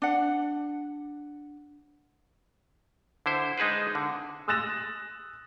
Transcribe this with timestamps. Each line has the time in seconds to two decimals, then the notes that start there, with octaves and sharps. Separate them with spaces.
0.02 D4 F#5
3.26 D3 E4 C5
3.58 G#3 D#4 G#4 B4 C5
3.95 D3
4.48 D#6 E6 F#6 A6 A#6 E7